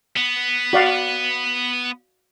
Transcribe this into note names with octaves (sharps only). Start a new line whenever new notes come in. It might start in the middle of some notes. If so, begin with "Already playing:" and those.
B3
F#4 D5 F5